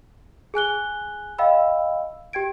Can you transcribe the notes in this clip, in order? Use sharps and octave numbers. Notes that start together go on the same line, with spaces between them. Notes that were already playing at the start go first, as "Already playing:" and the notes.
G#4 G#5 F#6 G7
D#5 F5 G5 B5 E6
G4 G5 G#6 D7